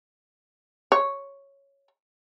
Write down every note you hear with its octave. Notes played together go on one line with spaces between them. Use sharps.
C#5